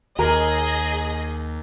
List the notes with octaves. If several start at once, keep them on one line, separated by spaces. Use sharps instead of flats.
D#2 G#4 A#4 D#5 A#5